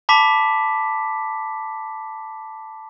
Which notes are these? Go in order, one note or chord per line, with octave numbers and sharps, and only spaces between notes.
A5 B5 D6 B6